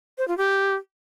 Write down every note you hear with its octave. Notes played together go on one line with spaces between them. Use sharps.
C5
F4
G4